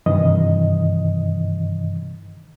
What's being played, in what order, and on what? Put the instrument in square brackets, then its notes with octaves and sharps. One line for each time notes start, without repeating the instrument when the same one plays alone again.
[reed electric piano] G2 C3 D#3 E3 D#5